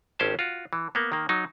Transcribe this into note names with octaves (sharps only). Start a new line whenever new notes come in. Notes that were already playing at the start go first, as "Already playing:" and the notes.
G#1 C#4 G4 C5 A5
F4 F#4
E3
A#3 B3
D#3 A#3
F#3 D#4